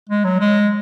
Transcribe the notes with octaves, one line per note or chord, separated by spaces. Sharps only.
G#3
F#3
G#3